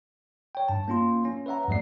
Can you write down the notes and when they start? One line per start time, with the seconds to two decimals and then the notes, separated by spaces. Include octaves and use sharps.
0.55 C#5 G5
0.68 G2 A5
0.88 A#3 C#4 F4 C6
1.25 C#4
1.46 B4 C#5 E5 F#5 A#5
1.68 E2 G2 F#3 A3 D5 C7